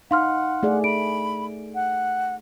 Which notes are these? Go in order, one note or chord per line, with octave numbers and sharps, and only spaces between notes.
D#4 F5 F#5 C6 F6
A3 G#4 D5
G#4 B5 D7
F#5